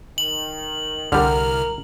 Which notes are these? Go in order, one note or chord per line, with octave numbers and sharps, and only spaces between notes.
D#3 F#7
C2 D3 G3 A#4 F6